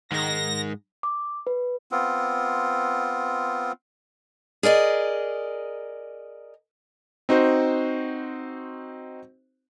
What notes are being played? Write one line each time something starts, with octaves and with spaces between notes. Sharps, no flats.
G#2 D#3 G#3 A#6
D6
B4
B3 C4 F4
G#4 A#4 D5 D#5
C4 D#4 F#4 C5